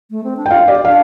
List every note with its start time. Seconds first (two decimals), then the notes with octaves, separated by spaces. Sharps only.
0.11 A3
0.24 C4
0.37 D4
0.46 G5
0.50 F4 F5
0.68 G4 D5
0.85 D4 F5